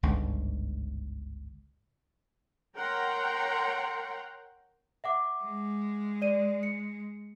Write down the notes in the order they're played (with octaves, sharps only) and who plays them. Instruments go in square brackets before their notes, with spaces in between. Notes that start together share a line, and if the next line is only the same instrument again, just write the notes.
[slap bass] G1 C#2 G#2 D3
[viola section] A#4 C#5 F#5 G5 A#5 C6
[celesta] E5 F#5 D6
[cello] G#3
[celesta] D5 D#7
C#7